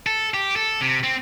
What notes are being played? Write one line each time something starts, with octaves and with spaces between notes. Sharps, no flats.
A4
G4
A4
C3
C4